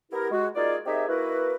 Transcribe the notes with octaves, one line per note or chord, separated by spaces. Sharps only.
B3 E4 G4 A#4
G#3 F#4
A#3 D#4 F4 G#4 D5
C4 D#4 G4 G#4 A#4 E5
A#3 E4 F#4 A#4 B4